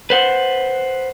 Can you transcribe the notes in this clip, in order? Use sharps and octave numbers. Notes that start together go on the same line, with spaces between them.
B4 C5 F#5